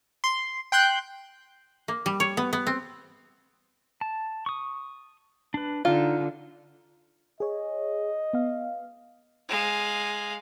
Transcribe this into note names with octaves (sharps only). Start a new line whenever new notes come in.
C6
G5 C6 F#6 G6
A#3
G3
C#5
B3
B3
C4
A5
C#6 D#6
D4 B4
D3 D#4 F4
G#4 C#5 D#5
B3 F5
G#3 F5